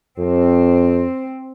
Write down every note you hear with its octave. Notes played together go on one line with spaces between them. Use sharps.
F2 C4